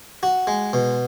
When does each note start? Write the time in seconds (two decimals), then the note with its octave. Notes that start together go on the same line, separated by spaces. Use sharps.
0.23 F#4
0.47 G#3
0.73 B2